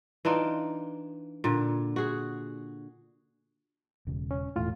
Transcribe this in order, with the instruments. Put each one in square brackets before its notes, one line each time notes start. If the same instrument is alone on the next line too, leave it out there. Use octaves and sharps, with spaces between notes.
[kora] E3 D4 D#4 F4
A#2 D3
F#4 G#4
[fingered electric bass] E1 C#3
[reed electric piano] C#4
[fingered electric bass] E1 E2 [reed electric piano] A2 F4